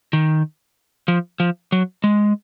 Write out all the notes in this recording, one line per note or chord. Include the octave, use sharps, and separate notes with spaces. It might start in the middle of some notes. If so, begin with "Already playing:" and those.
D#3
F3
F3
F#3
G#3